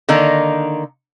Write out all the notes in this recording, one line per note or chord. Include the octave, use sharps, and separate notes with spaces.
D3 D#3 A#3 D#4